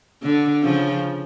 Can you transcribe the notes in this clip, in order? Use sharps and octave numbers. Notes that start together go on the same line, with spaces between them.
D3
C#3 F3